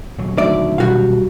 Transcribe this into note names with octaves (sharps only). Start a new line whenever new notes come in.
D#1 F#3
D2 A3 D#4 D5 E5
B2 G3 F#4 F5